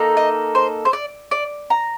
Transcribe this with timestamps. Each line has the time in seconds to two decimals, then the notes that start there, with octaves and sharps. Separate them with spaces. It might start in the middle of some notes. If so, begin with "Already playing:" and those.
Already playing: A#3 D#4 A4
0.17 D#5
0.55 C5
0.85 C5
0.93 D5
1.31 D5
1.70 A#5